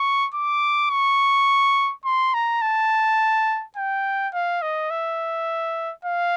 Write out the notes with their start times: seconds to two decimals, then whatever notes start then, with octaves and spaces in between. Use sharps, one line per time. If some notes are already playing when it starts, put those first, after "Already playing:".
Already playing: C#6
0.34 D6
0.90 C#6
2.05 C6
2.34 A#5
2.62 A5
3.77 G5
4.34 F5
4.62 D#5
4.90 E5
6.05 F5